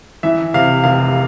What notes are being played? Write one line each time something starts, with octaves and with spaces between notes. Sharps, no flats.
E3 E5
C3 F5
F1 F5